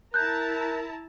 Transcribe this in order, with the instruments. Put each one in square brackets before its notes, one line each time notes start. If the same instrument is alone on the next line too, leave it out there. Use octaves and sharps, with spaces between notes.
[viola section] E4 A5 A#5 [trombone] A#4 [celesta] F#6 G6